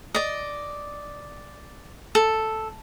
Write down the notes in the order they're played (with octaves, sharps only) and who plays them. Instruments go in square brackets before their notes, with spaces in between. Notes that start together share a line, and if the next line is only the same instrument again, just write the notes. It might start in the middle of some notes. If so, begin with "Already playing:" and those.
[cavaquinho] D5 D#5
A4